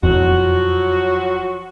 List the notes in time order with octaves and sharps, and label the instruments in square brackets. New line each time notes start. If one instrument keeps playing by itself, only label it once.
[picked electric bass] E1 F2 [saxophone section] F3 F#3 F#4